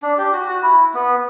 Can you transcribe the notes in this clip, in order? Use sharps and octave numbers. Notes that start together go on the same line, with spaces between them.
D4
G4
F#4
F#4
E4
B3